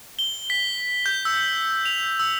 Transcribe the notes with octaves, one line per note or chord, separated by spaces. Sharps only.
G7
B6
G6
E6
F7
E6